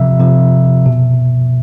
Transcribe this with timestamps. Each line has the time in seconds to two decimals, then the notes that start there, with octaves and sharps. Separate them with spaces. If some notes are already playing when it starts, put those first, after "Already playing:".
Already playing: C3 F3 E5
0.19 C3 F3
0.86 B2